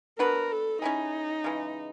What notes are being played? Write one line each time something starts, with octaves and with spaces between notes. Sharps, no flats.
B3 D4 F#4 A#4 B4
A4
C#4 D#4 E4 G#4
C#3 E3 G#3